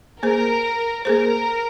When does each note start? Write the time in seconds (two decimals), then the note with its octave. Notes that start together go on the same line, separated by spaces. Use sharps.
0.23 A#3 G#4 A#4 C5
1.05 A#3 G#4 A#4 C5